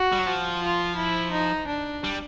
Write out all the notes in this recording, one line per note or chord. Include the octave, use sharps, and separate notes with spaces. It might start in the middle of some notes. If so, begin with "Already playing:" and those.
Already playing: F#4
G3
F#3
F3
F4
E4
D#4
D4
G3